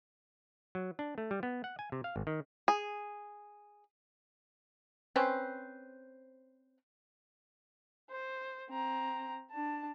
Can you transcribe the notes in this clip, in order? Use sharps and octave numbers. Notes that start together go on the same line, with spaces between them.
F#3
D4
A3
G3
B3
F#5
G#5
C3
F5
G#1
D#3
G#4
C4 C#4 B4 C5
C5
C4 A#5
D4 A5